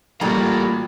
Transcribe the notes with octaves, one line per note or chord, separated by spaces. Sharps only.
A1 A#2 G3 A3 A#3 F#4 A#5 B5